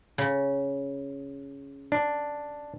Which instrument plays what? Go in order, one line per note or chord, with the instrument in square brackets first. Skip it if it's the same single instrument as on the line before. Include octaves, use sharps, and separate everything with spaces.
[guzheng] C#3
[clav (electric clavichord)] D4